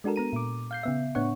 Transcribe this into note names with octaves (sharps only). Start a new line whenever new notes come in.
G#3 D4 F#4 A4 A#4
B3 A#5 D#7
A#2 D6
F5 G6 C7
C#3 B3 E5
A2 B3 D4 C#5 F#5 C#6